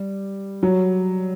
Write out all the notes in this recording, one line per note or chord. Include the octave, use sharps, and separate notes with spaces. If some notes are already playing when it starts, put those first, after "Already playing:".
Already playing: G3
F#3